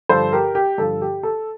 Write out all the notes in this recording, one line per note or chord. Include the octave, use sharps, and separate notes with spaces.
G2 D3 F3 A4 C5
G4 A#4
G4
G2 D3 F3 A4
G4
A4